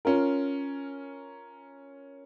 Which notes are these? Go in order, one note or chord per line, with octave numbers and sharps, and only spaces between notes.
C#4 F4 A#4